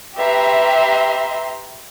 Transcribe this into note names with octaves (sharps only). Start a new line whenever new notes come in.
G4 B4 E5 A#5 C6